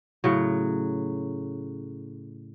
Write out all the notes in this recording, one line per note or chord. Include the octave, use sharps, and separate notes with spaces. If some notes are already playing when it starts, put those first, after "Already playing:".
A2 C#3 F#3